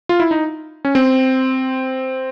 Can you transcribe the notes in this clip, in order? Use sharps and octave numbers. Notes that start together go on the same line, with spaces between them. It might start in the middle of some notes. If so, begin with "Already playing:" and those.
F4
E4
D#4
C#4
C4